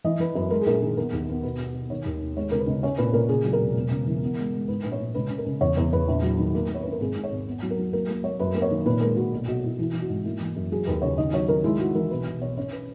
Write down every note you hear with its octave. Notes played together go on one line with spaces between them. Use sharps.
E3 D#5
E3 B4
F#2 B4
G#3 A#4
G#4
A#1 A#4
D#3 G#4
B3 A#4
D#2
B3
B2 B4
B2
B2
D#3 C#5
D#2
D#3
G#3 C#5
C#2 A#4
B4
C#2
C#4 C#5
A#2 B4
A#2 A#4
C#3 G#4
F#3
A#4
E1
E1
C#3
E3
B3
G#3
G#3
G#2 B4
A#1 B4
C#5
A#1
C#2 B4
C#3
A#4
C#3
E2 C#5
E2
E2 B4
A#1
F#3
D#3
A#3
A#3
C#5
C#4 B4
A#4
G#1 G#4
G#2
C#5
G#1
B3
F#3
A#4
F#3
A#3 A#4
A#3
A#3 C#5
F#2 B4
A#3
C#5
D#3
A#2 B4
G#3 A#4
A#2 F#4
B1
B1 F#4
B1 E4
E3 E4
E3
F#4
G#2
A#3 E4
E3
F#2
F#3 G#4
D#2 B4
C#3 C#5
D#3 D#5
F#3 C#5
D#3 A#4
G#3 E4
G#3 F#4
E3 A#4
B1 B4
B1
B1 C#5
C#4 C#5
B4